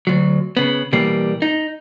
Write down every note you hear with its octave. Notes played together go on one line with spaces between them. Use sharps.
D2 F#3
C#3 B3
B2 E3 G3 A#3
D#4